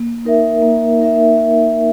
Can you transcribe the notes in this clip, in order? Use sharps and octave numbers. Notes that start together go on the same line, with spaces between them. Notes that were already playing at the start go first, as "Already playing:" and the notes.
Already playing: A#3
D#4 A#4 E5
A#3
D#4 A#4 E5